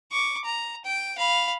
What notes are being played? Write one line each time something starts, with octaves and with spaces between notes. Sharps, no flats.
C#6 D6
A#5
G5
F5 B5